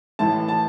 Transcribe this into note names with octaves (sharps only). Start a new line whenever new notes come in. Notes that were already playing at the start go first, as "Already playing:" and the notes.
A1 A2 E3 A5
A5